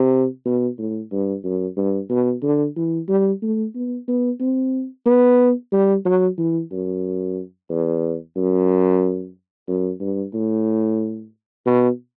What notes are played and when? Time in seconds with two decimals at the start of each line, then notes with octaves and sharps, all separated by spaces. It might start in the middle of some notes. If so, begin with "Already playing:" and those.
Already playing: C3
0.45 B2
0.78 A2
1.12 G2
1.44 F#2
1.77 G2
2.10 B2
2.43 D3
2.76 E3
3.09 G3
3.42 A3
3.75 B3
4.08 B3
4.40 C4
5.06 B3
5.72 G3
6.05 F#3
6.38 E3
6.72 F#2
7.70 E2
8.36 F#2
9.68 F#2
10.01 G2
10.34 A2
11.66 B2